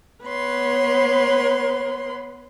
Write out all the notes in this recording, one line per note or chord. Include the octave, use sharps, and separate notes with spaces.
B3 B4 C#5 C6